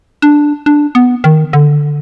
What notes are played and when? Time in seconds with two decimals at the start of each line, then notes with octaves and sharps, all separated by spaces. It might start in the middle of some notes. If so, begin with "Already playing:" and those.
0.22 D4
0.66 D4
0.95 B3
1.24 D#3
1.53 D3